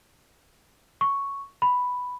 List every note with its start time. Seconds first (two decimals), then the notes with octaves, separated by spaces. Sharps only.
1.01 C#6
1.62 B5